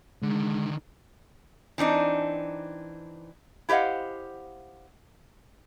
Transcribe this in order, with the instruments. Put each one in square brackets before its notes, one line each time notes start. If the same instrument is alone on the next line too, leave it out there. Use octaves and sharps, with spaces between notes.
[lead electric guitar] D3 D#3 [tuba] G#3
[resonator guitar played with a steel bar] E3 C4 D4 D#4
E4 G4 C5 D#5 F5 F#5